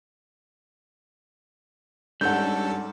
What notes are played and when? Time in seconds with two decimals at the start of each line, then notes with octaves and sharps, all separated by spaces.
2.21 G#2 G3 C#4 D4 A4 F#5 G6